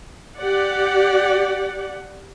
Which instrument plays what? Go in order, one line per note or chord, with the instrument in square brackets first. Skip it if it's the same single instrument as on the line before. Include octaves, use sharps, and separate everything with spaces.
[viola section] G4 D5 F#5